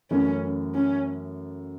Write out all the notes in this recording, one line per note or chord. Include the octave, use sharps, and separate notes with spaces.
F#2 E3 A3 C#4
C#4